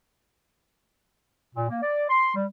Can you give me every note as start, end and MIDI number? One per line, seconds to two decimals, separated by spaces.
1.55 1.67 46
1.69 1.79 58
1.82 2.05 74
2.09 2.33 84
2.35 2.45 55